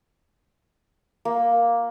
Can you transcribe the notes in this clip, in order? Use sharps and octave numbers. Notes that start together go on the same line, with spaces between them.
A#3